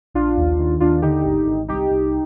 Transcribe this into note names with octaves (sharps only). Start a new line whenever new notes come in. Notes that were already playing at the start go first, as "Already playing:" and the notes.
A#1 D4 F4
D#2
D#3
D#2 D4 F4
D3 D#4 G4
G#1
G#1
C2 D#4 G4
C2